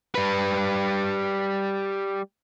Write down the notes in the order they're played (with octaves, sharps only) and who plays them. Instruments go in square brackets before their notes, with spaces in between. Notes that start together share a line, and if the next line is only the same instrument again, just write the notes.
[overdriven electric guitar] G3 B4